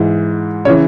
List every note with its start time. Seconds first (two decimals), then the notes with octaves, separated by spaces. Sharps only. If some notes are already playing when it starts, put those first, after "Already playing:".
Already playing: G#2 E3
0.65 C#3 E3 C#5